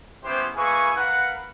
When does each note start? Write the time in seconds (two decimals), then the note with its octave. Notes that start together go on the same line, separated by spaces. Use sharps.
0.24 B3 C#4 E4 G4 C5
0.55 A#3 E4 G#4 B4 G#5 C#6
0.96 A#4 B4 F5 F#5